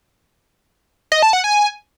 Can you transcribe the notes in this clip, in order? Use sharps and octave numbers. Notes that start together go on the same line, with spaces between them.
D#5
A5
F#5
G#5